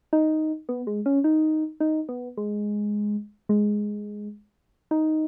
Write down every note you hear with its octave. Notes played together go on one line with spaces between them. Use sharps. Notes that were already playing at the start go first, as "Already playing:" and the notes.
D#4
B3
G#3
C#4
D#4
D#4
B3
G#3
G#3
D#4